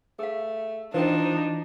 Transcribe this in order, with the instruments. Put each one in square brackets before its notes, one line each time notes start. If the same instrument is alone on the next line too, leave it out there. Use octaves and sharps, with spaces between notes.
[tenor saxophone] A3 [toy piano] G#4 F5
[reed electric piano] E3 [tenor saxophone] F3 [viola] D4 D#4 [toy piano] A#4 C5 G5